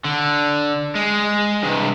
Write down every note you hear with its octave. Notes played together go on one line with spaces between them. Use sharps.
D3
G#3
G2 C3